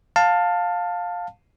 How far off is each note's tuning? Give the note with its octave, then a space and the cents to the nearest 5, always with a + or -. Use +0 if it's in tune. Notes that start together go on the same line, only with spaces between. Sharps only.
F5 +15 A5 +15